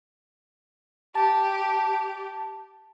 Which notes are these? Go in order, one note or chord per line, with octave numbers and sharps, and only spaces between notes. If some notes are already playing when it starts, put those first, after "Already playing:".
G4 A5